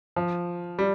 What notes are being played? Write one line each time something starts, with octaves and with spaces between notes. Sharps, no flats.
F3
G3